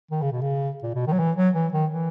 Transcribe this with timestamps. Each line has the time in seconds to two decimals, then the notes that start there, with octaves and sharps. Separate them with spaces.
0.11 D#3
0.22 C#3
0.32 B2
0.41 C#3
0.83 A#2
0.95 B2
1.07 D#3
1.13 F#3
1.19 E3
1.37 F#3
1.54 E3
1.73 D#3
1.90 E3